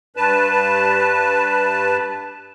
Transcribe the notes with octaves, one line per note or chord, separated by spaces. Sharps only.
G2 B4 A5